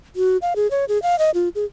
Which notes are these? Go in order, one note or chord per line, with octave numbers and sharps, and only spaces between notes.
F#4
F5
G#4
C#5
G#4
F5
D#5
F4
G#4